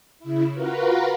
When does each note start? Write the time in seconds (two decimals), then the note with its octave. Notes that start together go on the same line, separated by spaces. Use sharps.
0.19 C#3 E4
0.53 F4 F#4 A#4 B4